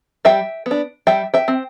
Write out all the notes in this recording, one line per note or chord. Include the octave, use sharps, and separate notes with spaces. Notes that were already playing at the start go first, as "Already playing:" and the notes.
G3 E5 G5
B3
D4
G3 E5 G5
E5 G5
C4